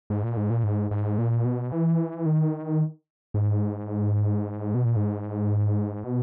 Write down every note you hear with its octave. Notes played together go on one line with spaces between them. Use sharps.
G#2
A#2
G#2
A#2
G#2
G#2
A#2
B2
E3
D#3
G#2
B2
A#2
G#2
B2